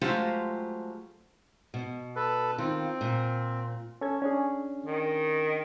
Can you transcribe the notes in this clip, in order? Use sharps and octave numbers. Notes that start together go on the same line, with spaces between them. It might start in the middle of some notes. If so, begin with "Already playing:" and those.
F#3 G#3 A3 F4 G4 C5
B2
A4 B4
D#3 C4 F4
A#2
C#4 A4 G#6
C#4 D4 G#4
D#3